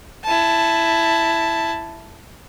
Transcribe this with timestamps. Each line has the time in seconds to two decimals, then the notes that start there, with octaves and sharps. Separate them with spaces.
0.25 E4 A5